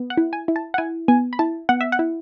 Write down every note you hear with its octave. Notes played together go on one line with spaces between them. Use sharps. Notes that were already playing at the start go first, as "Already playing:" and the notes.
Already playing: B3
F#5
E4
G#5
E4
A5
F#5
E4 G#5
B3 G#5
B5
E4 A5
B3 F#5
E5
F#5
E4